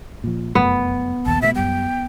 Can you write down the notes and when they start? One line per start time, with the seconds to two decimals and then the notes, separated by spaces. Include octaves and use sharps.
0.24 A#2 F3
0.55 F1 F#2 A3 B3
1.26 A#1 D#2 A5
1.42 B2 E3 A3 E5
1.56 F#2 G3 G5